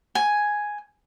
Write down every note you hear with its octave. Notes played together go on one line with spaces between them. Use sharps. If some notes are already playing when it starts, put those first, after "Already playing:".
G#5